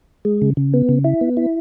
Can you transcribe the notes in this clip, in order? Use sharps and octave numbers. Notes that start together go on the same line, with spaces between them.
G#3
C#3
C#3
B3
C#3
E4
B3
E4